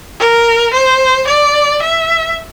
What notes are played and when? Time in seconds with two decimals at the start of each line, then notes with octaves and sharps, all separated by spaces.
0.20 A#4
0.74 C5
1.28 D5
1.82 E5